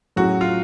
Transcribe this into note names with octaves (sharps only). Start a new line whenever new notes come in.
A2 F#3 C#4 F#4 G#4
F4